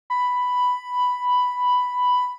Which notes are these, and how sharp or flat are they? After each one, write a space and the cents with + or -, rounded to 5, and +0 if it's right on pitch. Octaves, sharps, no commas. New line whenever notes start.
B5 +5